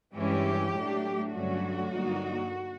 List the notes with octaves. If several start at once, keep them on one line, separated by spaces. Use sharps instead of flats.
G2 E3 G#3 C#4 E4 G4
A2 F#3 A3 D4
G2 D3 F#3 A3 C#4 F#4
G2 D3 F#3 A#3 D#4